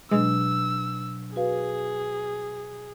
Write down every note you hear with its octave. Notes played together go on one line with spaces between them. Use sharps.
B2 F#3 G#3 D4 E6
F#4 G#4 B4 F5